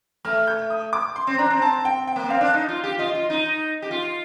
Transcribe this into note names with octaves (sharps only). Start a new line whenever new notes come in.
A3 F6
G6
D#6
D6
C6
C4
D4 A#5
C4
A5
G5
G5
A#3
C4 F5
D4
D#4
F4
G4
F4 D#5
F4
D#4
G4
F4